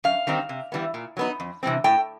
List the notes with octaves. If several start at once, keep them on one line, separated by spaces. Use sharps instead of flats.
F#2 F5
D#3 G3 C4 D#4
C3
E3 G3 B3
A#2
F#3 B3 D#4
F2
C3 E3 G3 C4
A2 G5